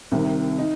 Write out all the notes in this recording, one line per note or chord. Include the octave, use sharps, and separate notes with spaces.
C2 C3 D#3
D#4